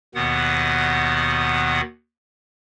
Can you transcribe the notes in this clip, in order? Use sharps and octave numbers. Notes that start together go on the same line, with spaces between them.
D#2 B2 D#3 B3 F#5